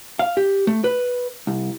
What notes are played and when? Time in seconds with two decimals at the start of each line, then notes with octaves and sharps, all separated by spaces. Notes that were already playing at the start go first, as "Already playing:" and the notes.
0.19 F5
0.37 G4
0.67 A3
0.84 B4
1.47 C2